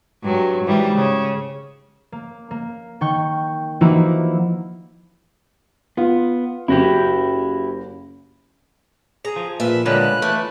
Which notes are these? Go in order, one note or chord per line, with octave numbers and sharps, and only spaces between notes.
G2 F#3
G#2 E3 G3
C#3
A#3
A#3
D#3 G5 C#6 G6
E3 F3 A#3 D#4 E4 F#4
B3 F4
F#1 E4 F#4 G4
G#4 A#5
F3
A#2 B4 E5
D3 G3 G#3 A#3 C#4 B4 F#6
E3 A3